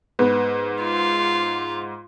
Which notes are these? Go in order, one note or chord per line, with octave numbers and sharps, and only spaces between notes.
G#2 B3
F4